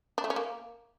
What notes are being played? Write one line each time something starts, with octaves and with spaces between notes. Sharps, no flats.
D4
A3
C#4
A#3